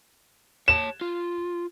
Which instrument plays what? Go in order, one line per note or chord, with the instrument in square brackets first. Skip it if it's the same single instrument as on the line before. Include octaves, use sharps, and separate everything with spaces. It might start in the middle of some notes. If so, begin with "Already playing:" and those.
[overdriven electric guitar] C#5 A5 [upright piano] E7
[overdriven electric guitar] F4